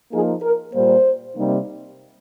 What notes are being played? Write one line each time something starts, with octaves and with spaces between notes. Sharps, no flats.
F3 A#3 D#4 G#4
A#4
A#2 G3 A#3 C5
C3 G3 A#3 D#4